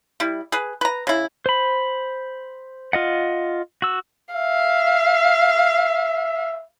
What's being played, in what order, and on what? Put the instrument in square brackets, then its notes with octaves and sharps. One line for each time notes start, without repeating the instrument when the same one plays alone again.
[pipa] G3 E4
G#4 B4
B4 A#5
C#3 E4
[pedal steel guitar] C5 B5
F4 D#5 F#5
F#4 E6
[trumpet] E5 [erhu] F5